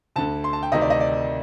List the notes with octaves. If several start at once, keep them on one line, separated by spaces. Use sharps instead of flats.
D2 D3 A5
C6
A5
G5
D2 C3 D#3 D#5
D5
D#5
D5